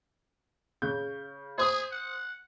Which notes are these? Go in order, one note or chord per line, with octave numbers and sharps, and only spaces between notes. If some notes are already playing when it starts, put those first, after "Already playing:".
C#3 G6
G#4 C5 D#6
F#5